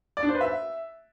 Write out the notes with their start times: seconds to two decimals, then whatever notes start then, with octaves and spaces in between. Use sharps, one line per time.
0.17 D5
0.23 D4
0.29 C5
0.35 B4
0.41 E5